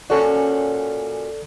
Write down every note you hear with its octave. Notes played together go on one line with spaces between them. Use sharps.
A#2 C#4 F#4 A4 D5